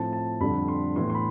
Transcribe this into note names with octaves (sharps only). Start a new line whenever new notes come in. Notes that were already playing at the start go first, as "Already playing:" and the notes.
Already playing: A2 F3 C4 A5
A5
F2 D3 G3 D4 B5
C6
A2 E3 B3 C6
C6
B5